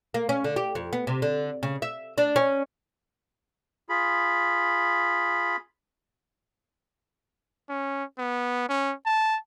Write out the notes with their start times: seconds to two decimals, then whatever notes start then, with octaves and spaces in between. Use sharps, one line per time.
0.14 A#3
0.29 C#4
0.44 D3
0.56 G4
0.75 F2
0.93 B3
1.07 C3
1.22 D3
1.63 C#3
1.82 E5
2.18 D4
2.36 C#4
3.89 F4 G#4 B5
7.70 C#4
8.18 B3
8.69 C#4
9.06 A5